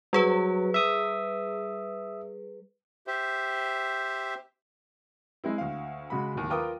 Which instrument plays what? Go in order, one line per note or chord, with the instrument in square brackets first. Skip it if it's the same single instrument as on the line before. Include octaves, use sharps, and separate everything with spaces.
[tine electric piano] F#3 [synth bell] G3 G#4 B4
[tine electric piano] E5 D#6
[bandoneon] G4 C5 E5
[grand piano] G#3 C4 E4
D2 F5
C#3 G#3 F#4 B5
D1 D#2
F4 A#4 B4 G5 D6 D#6